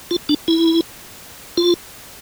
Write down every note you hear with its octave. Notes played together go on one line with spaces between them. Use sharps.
F4
D4
E4
F4